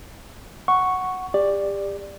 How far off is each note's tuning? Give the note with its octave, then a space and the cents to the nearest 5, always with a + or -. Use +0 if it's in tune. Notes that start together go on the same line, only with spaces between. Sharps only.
F#5 +0 C#6 +0
G4 +35 D5 +5